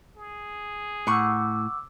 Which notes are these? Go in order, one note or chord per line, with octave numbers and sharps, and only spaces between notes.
G#4
A2 F#5 C#6 D6 E6